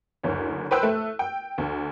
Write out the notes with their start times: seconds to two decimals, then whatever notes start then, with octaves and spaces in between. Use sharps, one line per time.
0.23 F#1 D2 C#5
0.71 B4 C5 G5 E6 F#6
0.83 A3
1.19 G5
1.58 D2